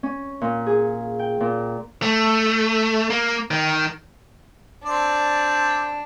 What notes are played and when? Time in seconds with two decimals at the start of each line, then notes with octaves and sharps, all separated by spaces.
0.03 C#4
0.41 A#2
0.67 G#4
1.19 G5
1.40 A#2
2.02 A3
3.10 A#3
3.51 D#3
4.86 C4 D4 D5